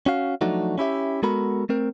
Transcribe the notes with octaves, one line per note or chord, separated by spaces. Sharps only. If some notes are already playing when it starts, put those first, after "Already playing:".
C#4 F#4 F5
F3 F#3 A3 D4 D#4 F#4
C#4 E4 G4 E5
G#3 B3 F#4 A4 A#4 B5
A3 C4 A#4